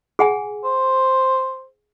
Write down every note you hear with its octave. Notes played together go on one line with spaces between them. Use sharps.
G#4 F#5 G#5
C5